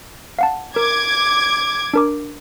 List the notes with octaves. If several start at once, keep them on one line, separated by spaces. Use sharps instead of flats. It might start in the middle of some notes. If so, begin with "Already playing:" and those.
F5 F#5 A5
A#4 D6 G#6
D4 A#4 D6